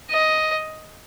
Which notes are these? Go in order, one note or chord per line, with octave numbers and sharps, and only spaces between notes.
D#5